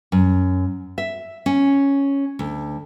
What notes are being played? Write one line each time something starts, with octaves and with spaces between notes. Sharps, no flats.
F#2
E5
C#4
D2